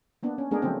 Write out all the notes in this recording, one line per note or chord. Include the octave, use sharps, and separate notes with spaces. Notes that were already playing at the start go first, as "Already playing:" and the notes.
A#3 B3 D4
C#4
G#3 A3 B3 D4 G#4 A#4
C#3 F3 F#3 A3 A#3 C4